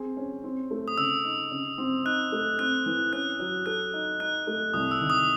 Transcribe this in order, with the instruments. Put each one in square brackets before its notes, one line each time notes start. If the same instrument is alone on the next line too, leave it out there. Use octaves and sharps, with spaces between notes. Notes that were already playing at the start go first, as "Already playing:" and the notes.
Already playing: [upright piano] C4 G#4
C#4
C4
A3
[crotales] D#6
[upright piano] C#3 [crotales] E6
[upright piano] D#4
C#3
C4
[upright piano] D#4 [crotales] F#6
[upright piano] A3
[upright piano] C4 [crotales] F#6
[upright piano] E3
[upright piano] C#4 [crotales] F#6
[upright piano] F#3
[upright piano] A4 [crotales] F#6
[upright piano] D#4
[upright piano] D#4 [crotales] F#6
[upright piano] A3
[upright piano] C2 [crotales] D#6
[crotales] E6
[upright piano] D#3
[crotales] D#6